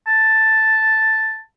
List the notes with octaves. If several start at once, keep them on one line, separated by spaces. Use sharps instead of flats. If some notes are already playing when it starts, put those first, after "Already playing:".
A5